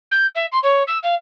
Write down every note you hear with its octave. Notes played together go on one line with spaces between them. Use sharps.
G6
E5
C6
C#5
E6
F5